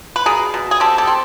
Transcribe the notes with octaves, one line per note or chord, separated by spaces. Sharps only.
B4
B2 G#4 A#4
B2
G#4
C4 G4 A4
G4 A4
C4